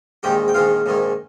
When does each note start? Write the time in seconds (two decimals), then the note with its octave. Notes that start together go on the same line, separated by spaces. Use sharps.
0.23 A#1 G#2 D#3 G#3 G4 G5
0.48 G5
0.54 A#1 G#2 D#3 G#3 F4 F5
0.86 A#1 G#2 D#3 G#3